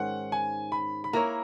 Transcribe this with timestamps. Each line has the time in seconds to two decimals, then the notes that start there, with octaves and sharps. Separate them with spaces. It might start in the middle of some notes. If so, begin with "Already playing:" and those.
Already playing: G#2 D#3 C#4 F#5
0.32 G#5
0.72 B5
1.04 B5
1.13 A#3 E4 A#4 C#5 A#5